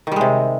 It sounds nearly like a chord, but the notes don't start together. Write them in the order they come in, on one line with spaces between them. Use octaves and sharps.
D#3 G3 G#3 C3